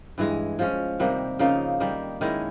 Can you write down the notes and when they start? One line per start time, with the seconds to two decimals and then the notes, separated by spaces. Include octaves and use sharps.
0.18 G2 E3 G#3
0.59 F3 G#3 C#4
0.99 C3 D#3 G3 A#3
1.39 C#3 F3 A#3 D#4
1.80 D#3 G3 A#3
2.21 D#3 G#3 C#4 E4